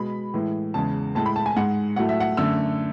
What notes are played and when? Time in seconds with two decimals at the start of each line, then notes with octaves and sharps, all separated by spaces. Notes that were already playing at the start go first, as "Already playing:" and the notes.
Already playing: B2 G#3 B5
0.34 A2 E3 G#3
0.74 E2 C#3 G#3 A5
1.15 A2 G#3 A5
1.26 B5
1.36 A5
1.46 G#5
1.56 G#2 G#3 F#5
1.96 A2 F#3 A3 F#5
2.09 E5
2.20 F#5
2.37 F#2 D3 A3 E6